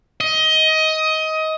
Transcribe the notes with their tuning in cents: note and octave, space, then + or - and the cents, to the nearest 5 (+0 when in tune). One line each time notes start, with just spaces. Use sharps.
D#5 +20